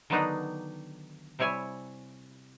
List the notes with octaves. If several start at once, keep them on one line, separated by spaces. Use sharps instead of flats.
D3 D#3 F#3 B3 D4 D#4
C3 G3 E4 C#5 G#5